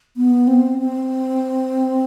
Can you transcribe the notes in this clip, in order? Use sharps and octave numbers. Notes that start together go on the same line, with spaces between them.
B3
C4
C4